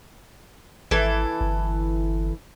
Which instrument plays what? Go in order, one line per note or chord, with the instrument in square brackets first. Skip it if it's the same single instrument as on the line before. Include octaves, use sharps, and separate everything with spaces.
[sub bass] G#1 [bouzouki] E3 A4
[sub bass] G1